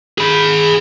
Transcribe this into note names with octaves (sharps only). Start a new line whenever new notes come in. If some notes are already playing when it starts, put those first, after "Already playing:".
G#4 B5